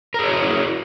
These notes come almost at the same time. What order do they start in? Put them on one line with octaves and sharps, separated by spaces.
A#4 G#4 C#5 F#4 E4